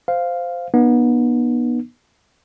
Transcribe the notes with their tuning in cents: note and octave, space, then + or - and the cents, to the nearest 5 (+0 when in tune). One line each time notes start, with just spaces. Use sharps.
C5 -10 F5 +0
B3 -30 D#4 -45